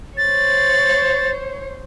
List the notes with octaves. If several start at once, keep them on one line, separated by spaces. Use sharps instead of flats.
C5 C#5 A6